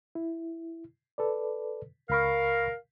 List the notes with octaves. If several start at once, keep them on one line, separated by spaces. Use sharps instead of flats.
E4
A4 B4 D5
C#2 A#4 F5 B5 C#6